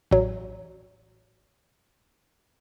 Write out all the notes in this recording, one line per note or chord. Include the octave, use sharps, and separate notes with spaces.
A1 F#3